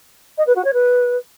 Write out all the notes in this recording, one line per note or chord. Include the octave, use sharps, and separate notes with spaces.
D#5
B4
F#4
C#5
B4